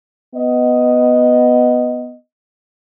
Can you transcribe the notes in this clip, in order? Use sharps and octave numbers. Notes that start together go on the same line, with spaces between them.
B3 D#5